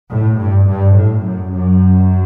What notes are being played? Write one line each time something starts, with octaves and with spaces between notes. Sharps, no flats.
A2
G2
G2
A2
F#2
F#2